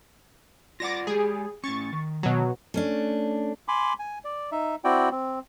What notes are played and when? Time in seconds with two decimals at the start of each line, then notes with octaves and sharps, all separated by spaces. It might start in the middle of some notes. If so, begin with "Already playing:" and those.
0.80 F4 D5 F#5 D6 A6 A#6
1.07 G#3 G4 G#4
1.64 A2 C#4 C#6 A6
1.93 D#3
2.23 B2 F#3
2.74 A3 C#4 D4
3.68 G#5 B5 C6 D6
3.99 G#5
4.24 D5
4.52 D#4 E5
4.84 C4 E4 F#4 D5 G5
5.12 C4